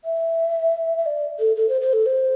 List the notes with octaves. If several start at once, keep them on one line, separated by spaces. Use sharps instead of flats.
E5
E5
D5
A4
A4
C5
C5
A4
C5